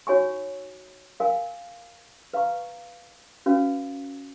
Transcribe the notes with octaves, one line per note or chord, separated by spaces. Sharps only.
D#4 F#4 C#5 G#5 C#6
A#4 F5 G#5
B4 F5 A#5 C#6
C#4 F#4 B4 F5